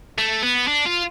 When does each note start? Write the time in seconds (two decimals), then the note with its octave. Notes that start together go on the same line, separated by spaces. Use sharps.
0.18 A3
0.42 B3
0.67 D4
0.85 F4